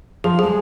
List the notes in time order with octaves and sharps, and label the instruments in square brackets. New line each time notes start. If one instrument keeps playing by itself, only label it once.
[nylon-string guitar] F3 [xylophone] G#4
[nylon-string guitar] G#3 [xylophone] G#4